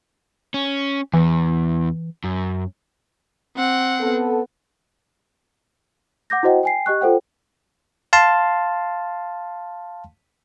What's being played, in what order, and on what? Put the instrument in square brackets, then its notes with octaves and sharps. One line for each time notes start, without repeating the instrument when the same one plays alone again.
[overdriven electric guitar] C#4
[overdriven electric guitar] E2 [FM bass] E3
[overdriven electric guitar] F#2
[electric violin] C4 F#5
[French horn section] B3 A4
[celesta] F#5 D6 G6 A#6
E4 F#4 C5 D#5 F#5 G5
G5 G#5 C7
G4 D#5 C#6 F#6
F4 A4 C5 F#5 G5
[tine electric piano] F5 A5 C6